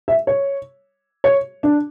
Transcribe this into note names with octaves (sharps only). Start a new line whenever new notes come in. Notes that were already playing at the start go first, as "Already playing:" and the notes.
E5
C#5
C#5
D4